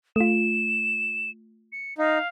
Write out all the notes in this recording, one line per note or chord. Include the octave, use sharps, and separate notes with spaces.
A3 F4 E7
C#7
D#4 F5